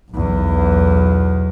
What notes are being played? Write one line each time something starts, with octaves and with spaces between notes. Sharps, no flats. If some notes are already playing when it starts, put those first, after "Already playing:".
B1 E2